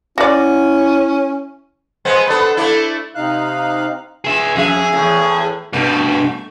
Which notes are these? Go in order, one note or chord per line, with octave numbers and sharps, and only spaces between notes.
C#4 E4 F#4 D5
G#3 B3 C4
B3 D4 A4
A3 D4 E4
C3 D#4 F5 F#6
G#4 E5
F2 G#4 E5
E2 A2
G2 B2 A3